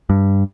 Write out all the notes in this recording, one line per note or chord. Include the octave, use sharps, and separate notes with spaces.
G2